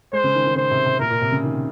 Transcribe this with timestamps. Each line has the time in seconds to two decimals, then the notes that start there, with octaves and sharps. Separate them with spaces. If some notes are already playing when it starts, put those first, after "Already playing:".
0.13 G#3 C5
0.24 C#3
0.35 D#3
0.46 D#3
0.56 C#3 C5
0.71 C3
0.86 C3
1.00 A#2 A#4
1.10 A#2
1.21 C3
1.32 C#3
1.44 D#3